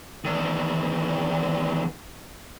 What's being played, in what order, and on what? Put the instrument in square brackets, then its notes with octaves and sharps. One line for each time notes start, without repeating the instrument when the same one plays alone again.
[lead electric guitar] E2 D#3